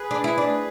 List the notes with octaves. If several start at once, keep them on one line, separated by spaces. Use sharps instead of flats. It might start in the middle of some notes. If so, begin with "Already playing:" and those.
Already playing: G#4 B4
D4
E4
D4